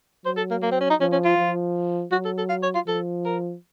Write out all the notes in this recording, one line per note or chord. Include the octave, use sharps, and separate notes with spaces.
F#3 C5
A4
A#3
A#3
C4
C#4
D#4
F3 C#4
C#4
F4
F3
F#3 F#4
A4
A4
F5
C#5
F4
F3 A4
A#4